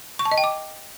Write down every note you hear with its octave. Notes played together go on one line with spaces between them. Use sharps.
C#6
A5
D#5
G5
D6